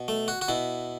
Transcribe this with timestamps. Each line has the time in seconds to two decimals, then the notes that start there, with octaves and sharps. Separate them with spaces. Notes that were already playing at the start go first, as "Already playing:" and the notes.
Already playing: B2
0.08 A3
0.28 F#4
0.41 F#4
0.48 B2 E4